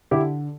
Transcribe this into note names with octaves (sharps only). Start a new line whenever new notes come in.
D3 E4 G4